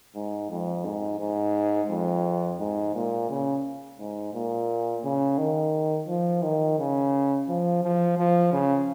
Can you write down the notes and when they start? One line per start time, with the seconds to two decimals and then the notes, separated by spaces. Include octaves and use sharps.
0.15 G#2
0.50 F2
0.85 G#2
1.20 G#2
1.90 F2
2.60 G#2
2.95 A#2
3.29 C#3
4.00 G#2
4.34 A#2
5.04 C#3
5.38 D#3
6.08 F3
6.43 D#3
6.79 C#3
7.48 F3
7.83 F3
8.17 F3
8.52 C#3